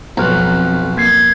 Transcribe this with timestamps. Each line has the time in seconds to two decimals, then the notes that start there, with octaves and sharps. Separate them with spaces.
0.17 B1 F2 A#5 F6 F#6
0.97 A#3 G#6 C7